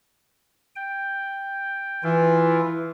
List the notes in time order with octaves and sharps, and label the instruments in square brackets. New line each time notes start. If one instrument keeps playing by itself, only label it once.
[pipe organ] G5
[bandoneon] E3 [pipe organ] E4 F4